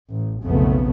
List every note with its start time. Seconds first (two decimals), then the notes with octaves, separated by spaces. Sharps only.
0.10 A1
0.44 F1 B1 F2 C#3 A3 B3